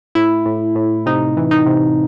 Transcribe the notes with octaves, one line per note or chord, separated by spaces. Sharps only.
A2 E4
A2
A2
C3 D#4
E3
D#4
C3